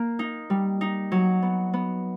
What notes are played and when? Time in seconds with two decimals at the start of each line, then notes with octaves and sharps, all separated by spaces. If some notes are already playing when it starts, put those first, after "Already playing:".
Already playing: A#3
0.19 D#4
0.50 G3
0.81 D#4
1.12 F#3
1.42 B3
1.74 B3